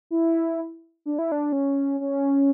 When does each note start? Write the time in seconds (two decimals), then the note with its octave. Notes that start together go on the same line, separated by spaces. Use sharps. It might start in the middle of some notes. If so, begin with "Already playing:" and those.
0.11 E4
1.06 D4
1.19 E4
1.32 D4
1.52 C#4
2.00 C#4